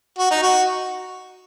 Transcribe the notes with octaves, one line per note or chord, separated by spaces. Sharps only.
F#4
D#4
F#4